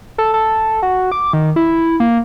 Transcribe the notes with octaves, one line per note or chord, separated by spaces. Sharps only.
A4
A4
F#4
D6
D#3
E4
A#3